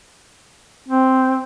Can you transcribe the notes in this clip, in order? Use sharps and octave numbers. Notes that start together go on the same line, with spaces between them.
C4